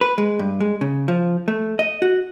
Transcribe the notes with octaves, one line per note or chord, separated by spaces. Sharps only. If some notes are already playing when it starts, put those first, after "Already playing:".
B4
G#3
G2
G#3
C#3
F3
A3
D#5
F#4